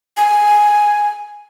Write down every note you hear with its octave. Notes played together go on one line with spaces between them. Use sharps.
G#5